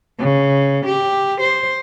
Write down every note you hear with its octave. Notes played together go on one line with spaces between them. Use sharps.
C#3
G4
C5